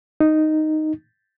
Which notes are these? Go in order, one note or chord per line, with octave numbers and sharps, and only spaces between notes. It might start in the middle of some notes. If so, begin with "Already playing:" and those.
D#4